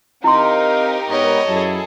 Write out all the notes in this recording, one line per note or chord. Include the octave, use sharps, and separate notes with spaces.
C4 D#4 E4 G4 A#4 D#5 F5 C6
G#2 B3 C#5 D#5
F#2 F#3 E4 G#4 A4